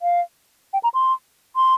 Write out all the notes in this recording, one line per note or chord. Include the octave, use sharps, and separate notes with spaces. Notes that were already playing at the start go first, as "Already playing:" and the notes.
F5
G5
A#5
C6
C6